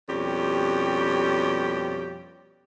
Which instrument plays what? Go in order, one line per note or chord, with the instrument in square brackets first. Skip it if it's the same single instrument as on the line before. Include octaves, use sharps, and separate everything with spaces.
[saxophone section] F2 B2 G3 C#4 G4